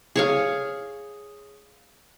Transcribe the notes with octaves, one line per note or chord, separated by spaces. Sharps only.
G#4 C#5 F5